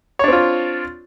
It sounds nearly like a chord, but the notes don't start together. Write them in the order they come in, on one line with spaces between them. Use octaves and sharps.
C#5 D4 C4 F4